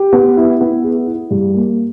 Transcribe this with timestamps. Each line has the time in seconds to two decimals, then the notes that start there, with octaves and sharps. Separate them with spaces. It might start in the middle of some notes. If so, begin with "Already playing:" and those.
Already playing: G4
0.13 B3
0.37 E4
0.61 B3
0.84 G#4
1.07 E4
1.31 G2
1.54 A#3